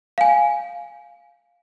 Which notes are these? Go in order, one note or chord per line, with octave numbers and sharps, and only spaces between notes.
F5 G#5